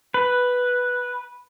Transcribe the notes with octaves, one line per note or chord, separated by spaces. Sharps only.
B4